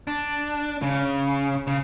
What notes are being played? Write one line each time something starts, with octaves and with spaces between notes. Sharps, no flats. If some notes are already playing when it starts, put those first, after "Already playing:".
D4
C#3
C#3